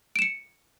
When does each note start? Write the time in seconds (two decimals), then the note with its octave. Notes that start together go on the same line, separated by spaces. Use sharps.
0.16 D7
0.19 E7
0.22 C#7